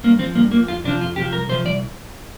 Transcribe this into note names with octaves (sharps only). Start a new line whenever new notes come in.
G2 A#3
F3 C4
G2 A#3
F3 A#3
F2 F4
C3 F3 D4
F2 F4
C3 F3 G4
C2 A#4
C3 F3 C5
C2 D5